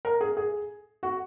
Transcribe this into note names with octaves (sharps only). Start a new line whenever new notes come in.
A#4
G#4
G#4
F#4